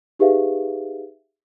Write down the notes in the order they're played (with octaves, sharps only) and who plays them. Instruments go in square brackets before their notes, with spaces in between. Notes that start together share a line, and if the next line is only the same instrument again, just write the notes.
[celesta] D#4 G4 G#4 B4 E5 F5